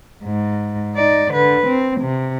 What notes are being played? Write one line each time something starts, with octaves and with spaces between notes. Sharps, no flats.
G#2
D#4 D5
D3 B4
C4
C3